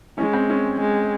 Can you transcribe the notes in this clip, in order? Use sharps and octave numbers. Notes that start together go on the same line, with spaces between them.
G#3 C#4
C4
C#4
G#3